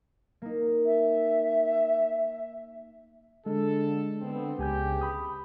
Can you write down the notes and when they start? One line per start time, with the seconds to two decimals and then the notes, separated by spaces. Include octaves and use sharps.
0.42 A#3 D#4
0.86 E5
3.46 D3 G#3 A4
4.21 D3 B3 C4
4.59 C#2 C#3 G4 G#5 G6
5.01 B5 D#6